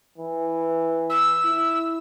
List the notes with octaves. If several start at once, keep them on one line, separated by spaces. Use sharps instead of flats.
E3
E6
E4